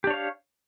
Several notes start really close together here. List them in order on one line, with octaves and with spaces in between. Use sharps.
G4 D4 C#5 F5